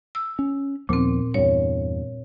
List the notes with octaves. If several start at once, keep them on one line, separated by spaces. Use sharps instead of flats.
E6
C#4
D#2 A#2 F3 B3 C4
E2 G2 C#5